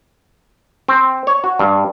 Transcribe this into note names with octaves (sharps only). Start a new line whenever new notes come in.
C4
C#5
F#4
G2